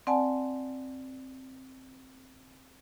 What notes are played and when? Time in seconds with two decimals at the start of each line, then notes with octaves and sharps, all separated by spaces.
0.07 C4 D5 F#5 G#5 A5